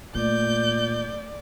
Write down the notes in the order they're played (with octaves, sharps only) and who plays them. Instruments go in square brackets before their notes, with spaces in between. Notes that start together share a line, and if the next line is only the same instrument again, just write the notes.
[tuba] A#2 [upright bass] A3 [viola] D5 [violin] G6